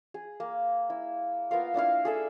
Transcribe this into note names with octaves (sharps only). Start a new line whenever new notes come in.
G#4
A#3
E4
B3 F4 A#4 F5
A#3 D4 E4 F5
G#4 A4 E5